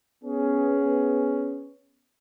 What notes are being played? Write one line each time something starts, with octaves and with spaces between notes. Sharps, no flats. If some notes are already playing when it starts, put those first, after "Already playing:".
B3 C#4 G#4